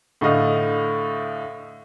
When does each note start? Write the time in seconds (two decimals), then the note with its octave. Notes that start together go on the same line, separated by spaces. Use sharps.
0.21 A2 D3 A3 D#5 F5